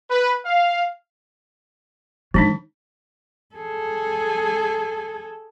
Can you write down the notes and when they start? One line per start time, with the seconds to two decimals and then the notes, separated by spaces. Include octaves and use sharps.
0.10 B4
0.45 F5
2.34 D#3 F3 G#3 D4 D#4
3.55 G#4 A4